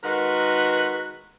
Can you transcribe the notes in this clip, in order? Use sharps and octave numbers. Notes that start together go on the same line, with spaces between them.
D#3 G#3 F#4 A#4 B4